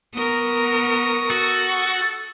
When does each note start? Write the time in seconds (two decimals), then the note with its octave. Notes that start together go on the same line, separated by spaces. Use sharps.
0.14 B3 A#4 C#6 D#6
1.30 F#4 A4